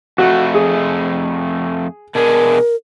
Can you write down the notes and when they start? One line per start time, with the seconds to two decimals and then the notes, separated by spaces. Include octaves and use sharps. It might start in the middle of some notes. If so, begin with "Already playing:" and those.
0.18 F2 A3 F#4
0.54 G#4
2.15 B2 D4 G#4 A#4